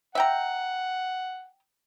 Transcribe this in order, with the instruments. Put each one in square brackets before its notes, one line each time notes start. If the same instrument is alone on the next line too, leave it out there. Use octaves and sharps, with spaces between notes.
[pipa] E5 G5 A#5 [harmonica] F#5